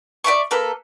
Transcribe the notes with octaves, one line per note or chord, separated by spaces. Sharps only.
D5 E5 A#5 C#6
A#3 A4 B4